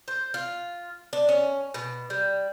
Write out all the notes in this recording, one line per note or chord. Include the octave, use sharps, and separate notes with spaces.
C5
F4
D4
C#4
B2
G3